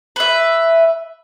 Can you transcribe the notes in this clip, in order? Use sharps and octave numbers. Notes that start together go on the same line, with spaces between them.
B4 E5